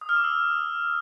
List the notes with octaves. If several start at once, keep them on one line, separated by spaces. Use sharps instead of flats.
D#6
F6
D6
E6